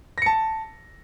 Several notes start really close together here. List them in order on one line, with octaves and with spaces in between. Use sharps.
A#6 C#7 A5